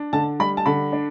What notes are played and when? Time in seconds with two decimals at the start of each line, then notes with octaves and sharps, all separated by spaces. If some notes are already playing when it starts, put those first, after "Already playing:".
Already playing: D4
0.13 D3 A5
0.39 G3 B5
0.57 A5
0.66 D3 B5
0.92 D4